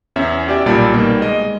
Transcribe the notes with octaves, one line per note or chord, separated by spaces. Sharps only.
E2 C#4 E5
F#4 G4 D5 E5
B1 A#2 G3 D5 A5 B5
B2 D#3 G3 A#3
G#3 D#5